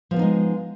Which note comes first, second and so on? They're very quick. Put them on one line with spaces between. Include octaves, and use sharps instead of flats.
F3 B3 D3 D#4 G#3